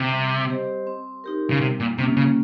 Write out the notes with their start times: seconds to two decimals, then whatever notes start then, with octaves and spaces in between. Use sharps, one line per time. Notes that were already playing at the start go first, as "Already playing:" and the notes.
Already playing: C3
0.12 G3
0.49 C4 G4 C5 D#5
0.87 C4
1.24 D#4 G4 A#4
1.50 C#3
1.61 C3 G3
1.80 A#2
1.98 C3 A#3 C#4 F4
2.17 C#3